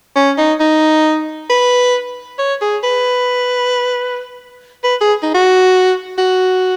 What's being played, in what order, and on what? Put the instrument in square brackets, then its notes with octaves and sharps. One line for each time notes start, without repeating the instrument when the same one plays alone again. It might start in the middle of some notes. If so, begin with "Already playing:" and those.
[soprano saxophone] C#4
D#4
D#4
B4
C#5
G#4
B4
B4
G#4
D#4
F#4
F#4